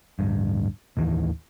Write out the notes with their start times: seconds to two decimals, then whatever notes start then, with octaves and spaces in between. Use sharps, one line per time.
0.19 D1 G1 G2
0.97 A1 D#2 D#3 E3